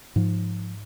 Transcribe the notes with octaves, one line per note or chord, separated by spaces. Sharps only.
G#2 F3